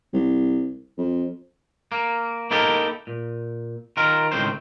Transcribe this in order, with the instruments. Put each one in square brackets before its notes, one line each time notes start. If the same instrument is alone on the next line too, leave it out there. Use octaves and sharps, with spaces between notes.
[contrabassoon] C2
F2
[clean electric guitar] A#3
A#3 D#4 E4 G4 A4 A#4
A#2
D#3 F4 A#4
C#2 A2 D#3 C4 C5